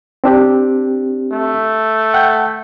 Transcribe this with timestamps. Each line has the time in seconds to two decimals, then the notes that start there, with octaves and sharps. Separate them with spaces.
0.24 C4 D4 G4
1.33 A3
2.14 F#5 G5 G6